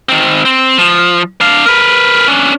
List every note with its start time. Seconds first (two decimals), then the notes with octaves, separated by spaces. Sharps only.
0.09 D#3 C4
0.45 C4
0.78 F3
1.41 D4 F5
1.65 A#4 B4
2.28 C#4 D4